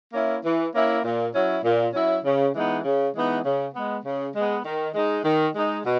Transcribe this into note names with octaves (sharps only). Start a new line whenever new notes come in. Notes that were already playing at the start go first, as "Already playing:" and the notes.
A#3 C#4 E4
E3
A#3 C#4 E4
A#2
F#3 C#4 E4
A#2
F#3 C#4 E4
C#3
E3 G#3 B3 D#4
C#3
E3 G#3 B3 D#4
C#3
G#3 B3
C#3
G#3
B3
D#3
G#3 D#4
D#3
G#3 D#4
B2